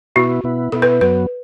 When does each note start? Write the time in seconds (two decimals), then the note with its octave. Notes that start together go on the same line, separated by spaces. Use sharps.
0.16 B2 B3 E4 F#4
0.44 B2 B3 E4
0.72 B2 B3 E4 A4
0.82 B4
1.01 F#2 F#3 B3 B4